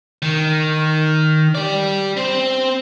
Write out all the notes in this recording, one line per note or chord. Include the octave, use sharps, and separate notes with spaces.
D#3
G4 D5
C4